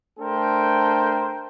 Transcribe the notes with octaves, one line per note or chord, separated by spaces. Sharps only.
A3 D4 A4 A#4 C5 G5